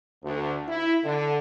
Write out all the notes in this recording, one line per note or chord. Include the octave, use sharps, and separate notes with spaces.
D2
E4
D3